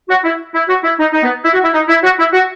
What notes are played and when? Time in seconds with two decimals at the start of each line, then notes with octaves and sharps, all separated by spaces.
0.09 F#4
0.24 E4
0.54 E4
0.69 F#4
0.83 E4
0.99 D#4
1.13 D#4
1.23 B3
1.43 E4
1.53 F#4
1.63 E4
1.74 D#4
1.89 E4
2.03 F#4
2.19 E4
2.33 F#4